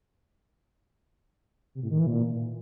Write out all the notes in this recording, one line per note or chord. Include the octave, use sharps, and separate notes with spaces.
C3
A2
D#3
E3
A#2